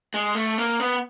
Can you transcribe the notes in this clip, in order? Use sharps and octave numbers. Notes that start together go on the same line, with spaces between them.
G#3
A3
A#3
B3